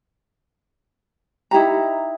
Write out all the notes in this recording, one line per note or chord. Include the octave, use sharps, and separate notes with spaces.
D#4 E4 G4 A#5